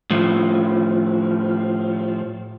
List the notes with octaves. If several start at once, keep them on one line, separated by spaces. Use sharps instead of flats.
A2 F3